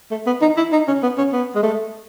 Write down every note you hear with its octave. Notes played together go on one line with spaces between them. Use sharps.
A3
B3
D#4
E4
D#4
C#4
B3
C#4
B3
G#3
A3